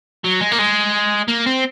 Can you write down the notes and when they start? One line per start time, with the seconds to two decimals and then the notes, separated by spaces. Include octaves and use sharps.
0.24 F#3
0.41 G#3
0.52 A#3
0.59 G#3
1.28 A#3
1.46 C4